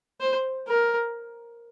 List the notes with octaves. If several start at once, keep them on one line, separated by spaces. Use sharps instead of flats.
C5
A#4